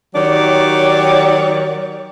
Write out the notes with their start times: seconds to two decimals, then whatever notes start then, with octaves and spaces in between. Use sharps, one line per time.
0.15 D#3 F#3 G4 C#5 D5